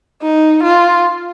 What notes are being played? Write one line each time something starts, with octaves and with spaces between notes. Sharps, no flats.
D#4
F4